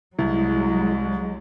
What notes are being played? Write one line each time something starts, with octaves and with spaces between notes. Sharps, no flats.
C2 F#3 G#3 E4